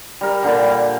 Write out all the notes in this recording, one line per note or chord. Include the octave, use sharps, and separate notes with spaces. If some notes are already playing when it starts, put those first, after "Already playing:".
G3 A#4
A#2 D3 G3